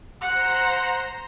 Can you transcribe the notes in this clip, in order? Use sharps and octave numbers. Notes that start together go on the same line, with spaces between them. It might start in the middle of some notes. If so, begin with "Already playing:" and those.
C5 F#5 A#5